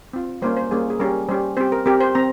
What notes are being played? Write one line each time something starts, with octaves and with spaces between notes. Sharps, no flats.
C4 F4
G3 A#3 C#4 C5
C5
G3 A#3 C#4 G#4
G#4
G3 C#4 G4 A#4
G3 C#4 G4 C5
C4 G4 C5
A#4
C4 G4 A#4
C5
C4 A#5